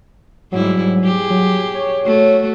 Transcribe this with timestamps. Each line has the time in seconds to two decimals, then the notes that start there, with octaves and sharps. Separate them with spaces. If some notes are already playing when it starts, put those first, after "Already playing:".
0.52 G#2 F#3 G3 E4
1.01 G4 G#4
1.30 F#3
1.74 C#5
2.05 A3 F#4